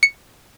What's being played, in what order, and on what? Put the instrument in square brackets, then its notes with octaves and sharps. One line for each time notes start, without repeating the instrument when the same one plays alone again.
[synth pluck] C#7